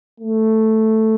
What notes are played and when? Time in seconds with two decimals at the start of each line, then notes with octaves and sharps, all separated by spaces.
0.20 A3